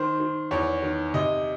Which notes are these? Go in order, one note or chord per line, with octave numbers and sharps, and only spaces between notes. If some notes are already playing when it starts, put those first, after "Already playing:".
Already playing: D#3 C5
D#3
E2 C#5
D#3
C3 D#5